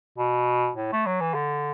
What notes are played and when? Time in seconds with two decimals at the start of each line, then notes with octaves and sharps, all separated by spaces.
0.18 B2
0.75 A2
0.93 A3
1.06 F#3
1.20 E3
1.34 D3